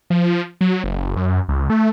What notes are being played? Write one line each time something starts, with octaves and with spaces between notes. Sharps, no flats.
F3
F#3
F#1
F#2
C#2
A3